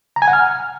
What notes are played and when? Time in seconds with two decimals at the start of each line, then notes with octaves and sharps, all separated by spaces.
0.16 A#5
0.22 G#5
0.28 F#5
0.33 F6